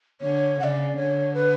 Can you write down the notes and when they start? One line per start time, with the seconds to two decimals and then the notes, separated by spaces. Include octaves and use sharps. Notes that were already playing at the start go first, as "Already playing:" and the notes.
0.21 D3 C#5
0.59 C#3 F#5
0.64 D5
0.96 D3 C#5
1.34 B4